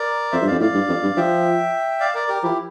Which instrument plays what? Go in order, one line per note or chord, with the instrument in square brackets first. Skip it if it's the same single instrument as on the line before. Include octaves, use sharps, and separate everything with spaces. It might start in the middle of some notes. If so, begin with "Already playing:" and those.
Already playing: [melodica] A#4 D5
[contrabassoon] F2 [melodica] C5 E5
[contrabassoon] G2
[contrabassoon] F2 [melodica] D5 F5
[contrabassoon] A2 [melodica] D5 F5
[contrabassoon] G2
F2
G2
[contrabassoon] F3 [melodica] E5 G5
[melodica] D5 F5
A#4 D5
G4 A#4
[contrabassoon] F3 [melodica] E4 G4